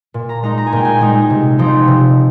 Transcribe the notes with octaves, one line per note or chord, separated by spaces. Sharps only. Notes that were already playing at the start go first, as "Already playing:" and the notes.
A#2
A#5
G#3 D#4 A#5
A#5
G#5
A#2 G5
G#5
G#3 D#4
C3
F3 C4 D#4
C3